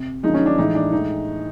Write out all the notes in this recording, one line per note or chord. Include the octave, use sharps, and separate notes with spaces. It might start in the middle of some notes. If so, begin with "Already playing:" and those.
Already playing: C3
F#2 D3 F3 G#3 D#4
C#4
D4
A2 E3 G#3 D#4
D4
A2 E3 G#3 D#4